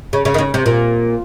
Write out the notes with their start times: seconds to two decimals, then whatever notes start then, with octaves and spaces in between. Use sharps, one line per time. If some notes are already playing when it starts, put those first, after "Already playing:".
0.13 C#3
0.25 C#3
0.34 D#3
0.38 C#3
0.54 C3
0.66 A#2